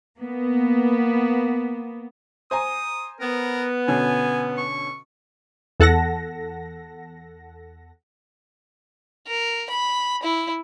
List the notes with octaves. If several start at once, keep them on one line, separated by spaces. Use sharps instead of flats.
A#3 B3
C5 G#5 A#5 D#6
B3 A#4
B2 D3 C#4 G#5
C#6
E2 A4 F#5 A5 A#6
A#4
B5
E4